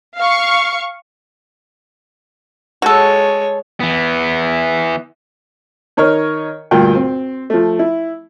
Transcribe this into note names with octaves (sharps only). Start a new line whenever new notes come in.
F5 C#6
G#3 F#4 A4 C#5
E3 B3
D#3 A#4 C#5 D#5 F6
D2 G2 A#2 A#4 G5
C4
F3 A3
E4